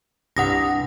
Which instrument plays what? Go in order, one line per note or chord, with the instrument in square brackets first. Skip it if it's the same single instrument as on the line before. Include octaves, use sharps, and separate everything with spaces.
[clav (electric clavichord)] C2 G2 [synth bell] F#5 D#6 A#6